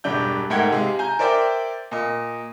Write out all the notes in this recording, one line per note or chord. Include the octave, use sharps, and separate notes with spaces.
E1 G2 D4 G6
G#2 A3 A#4 F#5 G5 G#6
C3 G#3 F5
G#5 A#5 G6
A#4 C5 D5 E5 G5
A#2 D#5